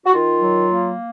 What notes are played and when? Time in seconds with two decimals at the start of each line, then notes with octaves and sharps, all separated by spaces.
0.05 F#4
0.13 D#3 F4
0.40 F#3
0.67 A#3